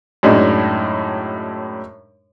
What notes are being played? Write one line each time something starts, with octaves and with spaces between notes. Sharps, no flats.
F#2 A2 G#3 D4 D#4